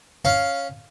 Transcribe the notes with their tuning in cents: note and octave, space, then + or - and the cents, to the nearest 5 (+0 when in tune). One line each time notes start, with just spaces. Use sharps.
C#4 +0 F5 +0